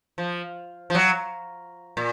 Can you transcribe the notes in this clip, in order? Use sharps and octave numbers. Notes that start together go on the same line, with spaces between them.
F3
F3
F#3
A#2